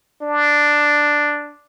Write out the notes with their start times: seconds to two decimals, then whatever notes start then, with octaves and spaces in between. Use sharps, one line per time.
0.22 D4